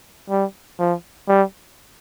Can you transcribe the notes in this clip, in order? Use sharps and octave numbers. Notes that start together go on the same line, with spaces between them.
G3
F3
G3